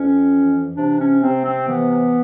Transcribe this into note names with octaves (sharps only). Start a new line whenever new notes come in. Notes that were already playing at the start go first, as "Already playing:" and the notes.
Already playing: F2 C#4
E3
C3 D4
C#4
C3 C4
C4
E3 B3